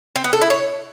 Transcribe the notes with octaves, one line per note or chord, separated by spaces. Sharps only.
C4
B3
A4
E4
C#5